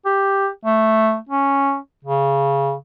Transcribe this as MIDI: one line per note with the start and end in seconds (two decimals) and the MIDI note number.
0.06 0.48 67
0.65 1.16 57
1.29 1.77 61
2.05 2.73 49